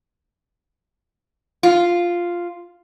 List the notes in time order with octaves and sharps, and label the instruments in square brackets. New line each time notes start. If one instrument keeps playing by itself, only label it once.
[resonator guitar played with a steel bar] F4